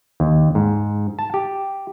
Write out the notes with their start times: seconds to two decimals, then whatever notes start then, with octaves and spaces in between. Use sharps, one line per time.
0.20 D#2
0.55 G#2
1.19 A5
1.34 G4